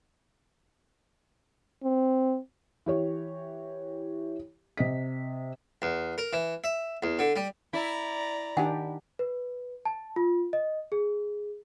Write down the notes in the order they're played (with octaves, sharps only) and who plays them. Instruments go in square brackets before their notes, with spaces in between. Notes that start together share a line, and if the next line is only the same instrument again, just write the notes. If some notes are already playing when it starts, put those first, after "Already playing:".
[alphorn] C4
[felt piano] E3 G4 C#5
C3 D#5 B6
[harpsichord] E2
A#4
E3
E5
E2
D3
G3
[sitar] E4 [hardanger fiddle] D5 A#5
[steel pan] D#3 D4 G4 [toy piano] F#5 G#5
[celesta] B4
A5
F4
D#5
G#4